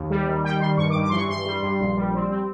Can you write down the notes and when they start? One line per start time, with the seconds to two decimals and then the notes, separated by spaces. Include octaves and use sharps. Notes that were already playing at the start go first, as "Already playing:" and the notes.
Already playing: D#2
0.10 G3
0.27 D#3
0.45 G3 G5
0.61 D#3 C6
0.77 G2 C#6
0.90 D6
0.95 G2
1.03 D6
1.10 E3 C6
1.17 C#6
1.29 G2 C6
1.46 G3
1.62 G2
1.80 A#1
1.96 G3
2.15 C4
2.31 C4